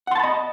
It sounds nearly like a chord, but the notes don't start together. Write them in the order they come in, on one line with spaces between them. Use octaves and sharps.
F#5 C6 A5 B5 D#5